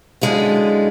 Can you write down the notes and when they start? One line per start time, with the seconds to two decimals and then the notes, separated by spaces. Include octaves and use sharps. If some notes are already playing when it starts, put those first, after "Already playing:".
0.21 F#2 D3 G#3 E4 F4